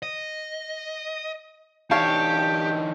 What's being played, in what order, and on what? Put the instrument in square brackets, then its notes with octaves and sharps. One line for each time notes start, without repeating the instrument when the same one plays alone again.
[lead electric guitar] D#5
[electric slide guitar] E3 D4 D#4 [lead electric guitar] G4 [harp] C#5 F5 A5 [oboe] G5